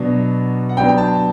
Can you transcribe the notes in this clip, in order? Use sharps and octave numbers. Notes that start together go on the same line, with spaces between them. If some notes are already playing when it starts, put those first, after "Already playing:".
Already playing: B2 F#3 B3 D4
F#5
F#3 B3 D4 G5
G5
A5